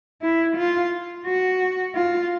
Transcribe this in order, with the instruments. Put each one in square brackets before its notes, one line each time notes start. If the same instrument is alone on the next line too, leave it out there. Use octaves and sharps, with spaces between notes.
[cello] E4
F4
F#4
F4